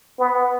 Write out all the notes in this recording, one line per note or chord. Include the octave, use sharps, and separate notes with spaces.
B3